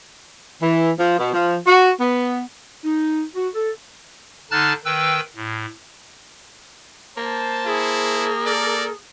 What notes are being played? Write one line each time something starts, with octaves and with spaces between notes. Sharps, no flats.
E3
F3
B2
F3
F#4
B3
D#4
F#4
A4
D3 D#4 A5 F6 F#6 A6
D#3 B4 G5 E6
A2
A#3 C5 A5
E4 G#4
A4 A#4 D5